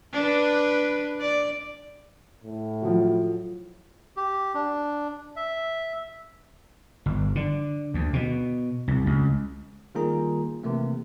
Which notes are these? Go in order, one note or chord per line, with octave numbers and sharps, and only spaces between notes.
D4 B4
D5
A2
F3 F#3
G4
D4
E5
G1
D3
D2
B2
C2
C#2
D#3 G3 A#3 F4 G#4 A#5
C3 E3 A3 A#3